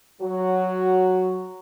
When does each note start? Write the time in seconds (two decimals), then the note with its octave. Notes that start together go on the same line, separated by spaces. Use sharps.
0.21 F#3 F#4